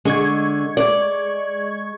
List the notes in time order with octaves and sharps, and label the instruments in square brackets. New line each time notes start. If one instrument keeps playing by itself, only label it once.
[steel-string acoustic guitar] D3 [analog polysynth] G#3 C#6 G#6
[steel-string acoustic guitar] D5